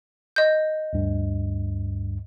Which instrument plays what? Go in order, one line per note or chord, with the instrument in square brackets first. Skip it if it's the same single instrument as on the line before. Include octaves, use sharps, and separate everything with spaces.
[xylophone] D#5 G6
[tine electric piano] D2 G2